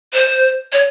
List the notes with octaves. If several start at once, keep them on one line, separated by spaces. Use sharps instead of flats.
C5
C#5